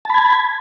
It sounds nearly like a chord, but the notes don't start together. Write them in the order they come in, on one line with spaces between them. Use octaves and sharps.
A5 B5 G#6